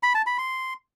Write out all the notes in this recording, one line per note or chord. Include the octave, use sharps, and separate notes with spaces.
B5
A5
B5
C6